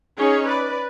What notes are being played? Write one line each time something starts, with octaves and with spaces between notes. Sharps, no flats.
C#4 D#4 G#4 C#5
B4 D5